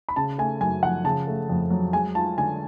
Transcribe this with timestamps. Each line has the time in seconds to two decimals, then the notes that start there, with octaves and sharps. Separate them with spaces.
0.09 B5
0.16 C#3 A5
0.38 A3 G#5
0.61 F#2 G#5
0.83 F3 F#5
1.04 C#3 A5
1.27 A3
1.49 F2
1.71 F#3
1.93 G#3 G#5
2.15 F4 A5
2.37 D3 G#5